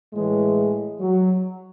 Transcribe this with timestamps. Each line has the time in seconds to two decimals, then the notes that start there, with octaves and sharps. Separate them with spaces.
0.12 A2 E3 G#3
1.00 F#3